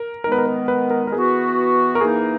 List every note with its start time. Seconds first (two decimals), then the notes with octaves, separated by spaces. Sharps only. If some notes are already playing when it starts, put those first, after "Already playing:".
Already playing: A#4
0.24 D#3 G#3 B3 A#4
0.32 B4
0.38 A#4
0.46 B4
0.68 B4
0.90 A#4
1.07 A#4
1.12 E3 B3 F#4 G#4 B4
1.95 A#4
2.01 E3 A#3 D#4 G#4